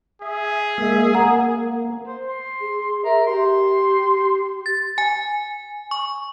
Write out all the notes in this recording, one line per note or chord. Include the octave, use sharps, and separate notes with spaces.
G#4 E5
G#3 A#3 E5
A#3 F#5 A#5
C5
C6
G#4
A#4 E5
G4 C6
A6
G#5
C#6